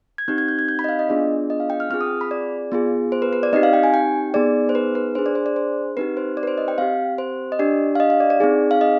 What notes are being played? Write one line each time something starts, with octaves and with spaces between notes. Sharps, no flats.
G#6
C4 D#4 G4 G6
G#6
G6
G#6
G6
B5
D#5
F5
D#5
B3 D4 F4 G#4 D5
D#5
F5
G5
F6
C4 F4 G#4 F6
D#6
B5
D5
B3 F4 G#4
C5
B4
B4
D5
C4 D#4 G4 D#5
F5
G5
G#5
G5
B3 D#4 G#4 D5
C5
B4
B4
D4 G#4 C5
D5
C5
D5
C5
C4 D#4 G4 B4
C5
D5
B4
C5
D#5
G5
C4 G4 F5
C5
D#5
D4 G4 D5
F5
D#5
F5
D5
D5
C4 D#4 G#4
F5
D#5